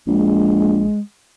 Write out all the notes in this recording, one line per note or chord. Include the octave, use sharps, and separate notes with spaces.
A#1 G#3